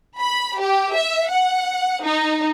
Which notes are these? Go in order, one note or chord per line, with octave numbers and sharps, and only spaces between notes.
B5
G4
E5
F#5
D#4